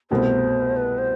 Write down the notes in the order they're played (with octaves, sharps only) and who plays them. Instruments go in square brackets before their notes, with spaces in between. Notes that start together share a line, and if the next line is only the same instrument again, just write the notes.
[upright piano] C2 B2 A3 [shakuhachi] C5
[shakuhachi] B4
C5